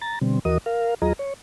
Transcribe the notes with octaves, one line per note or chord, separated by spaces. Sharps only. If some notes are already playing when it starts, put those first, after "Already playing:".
A#5 A6
B2 D3 G3 C4
D#2 E3 F#4 A#4 D#5 D#6
A#4 F5
D#2 F#3 F4 G#4 D#5 A#5
C#5